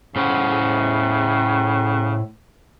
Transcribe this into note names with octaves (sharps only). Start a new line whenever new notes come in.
A2 C#3 C5 F#5